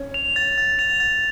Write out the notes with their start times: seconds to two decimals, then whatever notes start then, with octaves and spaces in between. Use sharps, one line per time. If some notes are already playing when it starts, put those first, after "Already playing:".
Already playing: C#4
0.14 F7
0.36 A6
0.58 A6
0.79 F7
1.00 A6